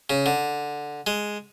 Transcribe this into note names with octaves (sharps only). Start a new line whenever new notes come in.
C#3
D3
G#3